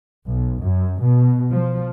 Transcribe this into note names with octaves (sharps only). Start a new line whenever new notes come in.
B1
F#2
B2
F3